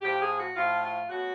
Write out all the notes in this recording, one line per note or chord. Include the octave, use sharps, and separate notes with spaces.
A2 F3 A3 G4
G#4
F#4
A2 F3 A3 F4
F4
B2 F#3 A3 F#4